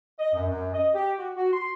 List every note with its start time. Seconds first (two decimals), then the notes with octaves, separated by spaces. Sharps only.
0.19 D#5
0.34 F#2
0.48 F#2
0.74 D#5
0.94 G4
1.19 F#4
1.36 F#4
1.53 C6